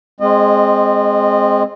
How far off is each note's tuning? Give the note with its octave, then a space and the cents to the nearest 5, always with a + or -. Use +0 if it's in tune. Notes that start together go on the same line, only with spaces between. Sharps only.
G#3 +0 C4 +0 D#5 -30